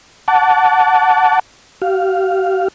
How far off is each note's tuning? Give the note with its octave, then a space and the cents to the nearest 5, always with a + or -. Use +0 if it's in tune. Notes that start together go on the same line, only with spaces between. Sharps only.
F#5 +0 A5 +0 D6 -40
G4 -45 F5 +0